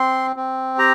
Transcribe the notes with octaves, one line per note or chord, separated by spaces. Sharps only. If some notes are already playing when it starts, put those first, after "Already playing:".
Already playing: C4 C6
C4
G4 A#5